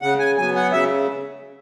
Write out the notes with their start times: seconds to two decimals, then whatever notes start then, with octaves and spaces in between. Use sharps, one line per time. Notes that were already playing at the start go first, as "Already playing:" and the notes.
0.02 C#3 F#5
0.19 G#5
0.37 F#3 B3 G#5
0.55 F#5
0.72 C#3 E5